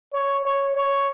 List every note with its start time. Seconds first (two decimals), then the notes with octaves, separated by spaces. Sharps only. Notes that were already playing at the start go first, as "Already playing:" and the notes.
0.13 C#5
0.45 C#5
0.75 C#5